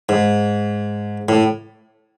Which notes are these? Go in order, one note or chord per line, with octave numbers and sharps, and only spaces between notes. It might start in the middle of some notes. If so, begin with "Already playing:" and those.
G#2
A2